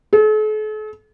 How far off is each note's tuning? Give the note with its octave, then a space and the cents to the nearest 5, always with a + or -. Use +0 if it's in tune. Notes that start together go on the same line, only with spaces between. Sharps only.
A4 -45